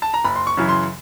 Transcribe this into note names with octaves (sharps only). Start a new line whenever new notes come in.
A5
A#5
F#1 B5
C6
C#6
F#2 C#3 E3
C6